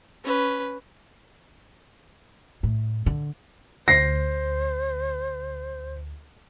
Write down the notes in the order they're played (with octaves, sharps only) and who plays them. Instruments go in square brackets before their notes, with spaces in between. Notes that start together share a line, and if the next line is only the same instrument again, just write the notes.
[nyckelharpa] C#4 B4
[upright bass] A2
D3
[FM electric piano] D2 [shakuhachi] C5 [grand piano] A#6 C7